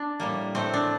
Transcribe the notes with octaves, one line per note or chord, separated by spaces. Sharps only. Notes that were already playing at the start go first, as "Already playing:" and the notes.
Already playing: D4
A2 G3 A#3
A2 A3 C4
D4